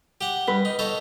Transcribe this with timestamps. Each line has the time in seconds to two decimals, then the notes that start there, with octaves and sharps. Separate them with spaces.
0.21 G4 F#5
0.48 G2 B4
0.65 D#4
0.79 D#4 A4 C#5